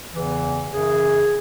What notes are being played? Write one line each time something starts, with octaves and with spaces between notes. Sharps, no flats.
E2 C#3 E3
F#2 C#3 E3 G#4